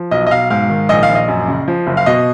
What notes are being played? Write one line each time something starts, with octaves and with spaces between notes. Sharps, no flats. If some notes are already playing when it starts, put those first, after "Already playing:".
Already playing: F3
B1 D#5
D#5
B1 F5
G#2 F5
D#3
A#1 D#5
F5
A#1
D#5
F#2
C#3
F3
F#1
F5
B2 D#5